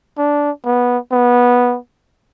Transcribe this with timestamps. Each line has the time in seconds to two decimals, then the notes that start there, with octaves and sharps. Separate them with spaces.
0.18 D4
0.65 B3
1.12 B3